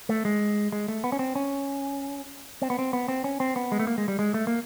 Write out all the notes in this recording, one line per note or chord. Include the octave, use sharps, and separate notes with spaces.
A3
G#3
G#3
A3
B3
C#4
C4
C#4
C4
B3
C4
B3
C4
C#4
C4
B3
G#3
A3
A#3
G#3
G3
G#3
A3
A#3